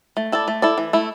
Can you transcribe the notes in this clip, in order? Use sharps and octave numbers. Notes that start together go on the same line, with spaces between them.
A3
E4 A4 D5
A3
E4 A4 D5
E3
A3 E4